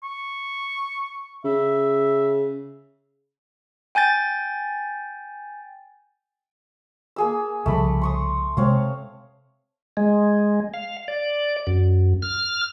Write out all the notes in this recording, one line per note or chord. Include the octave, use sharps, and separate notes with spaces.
C#6
C#3 E5
G5 G#5 G6 A6
A#3 G#4 E6
C2 C#3 F3 A3 B5 D6
C6 C#6 D#6
C3 G#3 C4 C#5 F5
G#3
F5
D5
F#2
F6